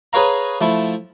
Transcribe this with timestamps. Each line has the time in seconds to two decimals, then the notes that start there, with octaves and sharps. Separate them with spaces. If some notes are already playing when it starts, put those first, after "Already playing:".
0.13 G#4 B4 C#5 F5 A#5
0.61 F3 A3 E4